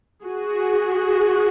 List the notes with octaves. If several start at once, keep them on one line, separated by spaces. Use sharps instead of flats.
F#4 G#4